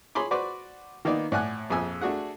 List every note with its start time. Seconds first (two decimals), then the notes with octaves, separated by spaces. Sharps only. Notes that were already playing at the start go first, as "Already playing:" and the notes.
0.15 G#4 C#5 G#5 B5 C6 D6
0.31 F#4 B4 C5 D5 C#6 D6
1.05 D#3 A#3 B3 D#4 D5
1.32 A2 D5 F#5 G#5 F#6
1.70 A#1 F2 G#4 G#5 E6
2.01 A3 D4 F#4 G#4 F#5